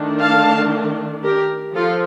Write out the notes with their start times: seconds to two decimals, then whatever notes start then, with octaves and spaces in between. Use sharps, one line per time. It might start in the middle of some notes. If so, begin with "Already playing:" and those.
Already playing: D#3 A3 D4
0.21 F5 A5
1.24 G4 A#4
1.75 F3 F4 A4